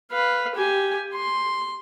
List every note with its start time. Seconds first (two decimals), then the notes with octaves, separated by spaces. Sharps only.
0.12 B4 F5
0.55 G4 G#5
1.14 C6